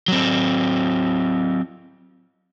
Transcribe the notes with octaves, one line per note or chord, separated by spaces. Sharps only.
F#3 C4